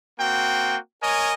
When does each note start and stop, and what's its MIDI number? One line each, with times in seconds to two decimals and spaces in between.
0.19 0.77 58
0.19 0.77 60
0.19 0.77 66
0.19 0.77 79
1.02 1.32 70
1.02 1.32 73
1.02 1.32 75
1.02 1.32 80